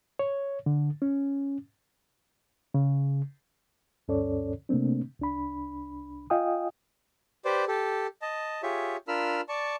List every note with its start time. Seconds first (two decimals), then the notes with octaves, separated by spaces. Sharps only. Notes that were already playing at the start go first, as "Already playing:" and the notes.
0.19 C#5
0.66 D3
1.02 C#4
2.74 C#3
4.08 D2 G2 C#4 A4 C#5 D5
4.69 C3 A3 A#3 C4 D4
5.19 C2 D4 B5
6.30 F4 D#5 F5 G5 G#5 D#6
7.45 G4 B4 C5 D5
7.68 G4 A4
8.22 D#5 A5
8.63 F4 G4 G#4 C#5 E5
9.08 D4 F4 A#4 B5 E6 F6
9.49 D5 A5 C#6